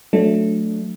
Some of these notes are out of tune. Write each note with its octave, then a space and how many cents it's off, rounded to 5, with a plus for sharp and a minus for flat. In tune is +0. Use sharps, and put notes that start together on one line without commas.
F#3 -25 A3 +0 D4 +0